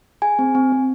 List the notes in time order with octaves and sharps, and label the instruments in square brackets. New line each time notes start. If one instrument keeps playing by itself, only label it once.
[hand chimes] G#4 G#5
C4
C4
C4